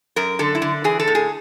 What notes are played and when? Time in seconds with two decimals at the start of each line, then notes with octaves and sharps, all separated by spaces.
0.16 F#2 A#4
0.39 D3 A4
0.55 E4
0.62 D3
0.84 E3 G#4
1.00 A4
1.07 A2
1.15 G#4